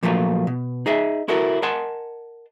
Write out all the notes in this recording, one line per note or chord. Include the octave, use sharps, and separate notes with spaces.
A#2 F3 F#3 A3 A#3 F4
B2
D#4 G#4 D#5 E5
E4 F#4 A4 A#4
A#4 D#5 F#5 G#5 A5 C6